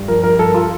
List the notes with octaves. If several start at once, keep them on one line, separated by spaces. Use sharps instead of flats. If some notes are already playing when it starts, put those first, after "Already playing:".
Already playing: G2
F3 A#4
F3 A#4
G2 A4
F4